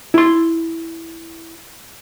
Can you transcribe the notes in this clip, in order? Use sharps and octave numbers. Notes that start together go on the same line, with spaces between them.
E4 C6